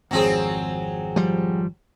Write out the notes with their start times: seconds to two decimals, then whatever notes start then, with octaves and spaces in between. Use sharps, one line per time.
0.11 G#1 F2 F#3 C4 G#4
1.16 F3 G3